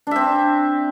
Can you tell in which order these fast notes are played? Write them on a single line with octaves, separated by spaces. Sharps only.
D4 E5 C4